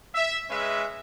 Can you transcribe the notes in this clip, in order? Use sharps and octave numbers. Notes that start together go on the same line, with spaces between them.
E5
G#3 C#4 B4 E5